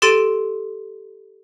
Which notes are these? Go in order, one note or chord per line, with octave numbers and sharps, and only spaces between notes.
G4 A4 C6 A6 D7 D#7